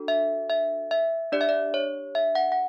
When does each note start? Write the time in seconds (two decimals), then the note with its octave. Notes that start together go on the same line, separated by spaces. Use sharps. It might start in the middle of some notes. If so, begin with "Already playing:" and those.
Already playing: D4 F#4 A4
0.08 E5
0.50 E5
0.91 E5
1.32 D4 G4 D5
1.41 E5
1.49 D5
1.74 C#5
2.15 E5
2.35 F#5
2.52 F#5